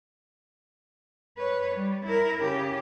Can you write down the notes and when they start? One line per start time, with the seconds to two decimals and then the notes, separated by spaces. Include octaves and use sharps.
1.38 B4 C#5
1.75 G3
2.05 E4 A#4
2.42 C#3 G4